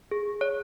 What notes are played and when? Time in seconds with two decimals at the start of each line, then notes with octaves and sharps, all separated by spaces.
0.11 G#4
0.41 C#5